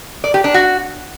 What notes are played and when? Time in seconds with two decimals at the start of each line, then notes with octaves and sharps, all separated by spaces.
0.24 D5
0.34 G4
0.44 D4
0.54 F#4